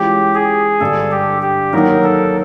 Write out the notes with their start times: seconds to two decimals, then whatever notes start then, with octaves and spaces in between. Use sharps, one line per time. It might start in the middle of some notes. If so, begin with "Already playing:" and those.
Already playing: E3 G#3 C#4 F4 G4
0.35 G#4
0.80 G2 D3 G3 A4
1.12 G4
1.42 G4
1.73 D#3 F#3 A#3 D#4 F#4 A#4
2.04 A4